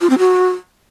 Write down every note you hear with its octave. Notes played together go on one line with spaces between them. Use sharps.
F4
C4
F#4